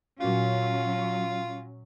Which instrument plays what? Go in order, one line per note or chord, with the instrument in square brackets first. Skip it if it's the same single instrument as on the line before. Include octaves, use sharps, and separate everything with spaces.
[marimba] A#2 F#4 [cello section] F#3 C#4 [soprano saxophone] F4